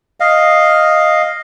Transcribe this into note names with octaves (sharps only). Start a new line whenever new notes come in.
D#5 F5